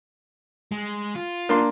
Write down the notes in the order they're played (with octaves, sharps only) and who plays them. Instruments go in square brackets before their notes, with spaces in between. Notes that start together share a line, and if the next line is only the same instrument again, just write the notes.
[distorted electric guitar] G#3
F4
[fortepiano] A#3 D4 C6